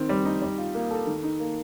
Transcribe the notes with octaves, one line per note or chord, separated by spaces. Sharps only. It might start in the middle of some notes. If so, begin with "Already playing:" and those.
Already playing: D#3 C4
G3
D#4
G3
F4
A#3
A4
D#3
D#4
A#3